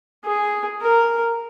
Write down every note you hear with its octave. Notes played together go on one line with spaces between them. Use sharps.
G#4
A#4